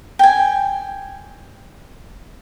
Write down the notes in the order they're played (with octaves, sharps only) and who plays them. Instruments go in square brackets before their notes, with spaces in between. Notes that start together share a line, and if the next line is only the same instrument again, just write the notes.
[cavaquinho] G5 G#5